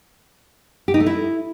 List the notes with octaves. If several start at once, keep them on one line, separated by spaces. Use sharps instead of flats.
G4
D#4
A3
E4